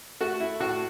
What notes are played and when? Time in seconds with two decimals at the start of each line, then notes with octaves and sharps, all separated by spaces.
0.21 A3 F#4
0.40 E4
0.60 A2 F#4